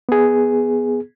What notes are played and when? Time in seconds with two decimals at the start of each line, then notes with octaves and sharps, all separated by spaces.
0.09 B3 G#4